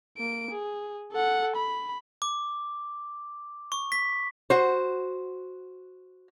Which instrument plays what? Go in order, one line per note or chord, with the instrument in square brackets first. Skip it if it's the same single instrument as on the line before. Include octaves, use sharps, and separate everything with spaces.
[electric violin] A#3 D7
G#4
A4 F#5
B5
[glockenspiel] D6
C#6
B6
[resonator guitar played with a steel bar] F#4 C5